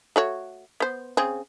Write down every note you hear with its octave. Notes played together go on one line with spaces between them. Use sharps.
A3 F#4 C#5
B3 C5
C#3 C4 G#4